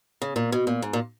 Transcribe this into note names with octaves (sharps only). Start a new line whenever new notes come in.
C#3
A#2
B2
A#2
G#2
A#2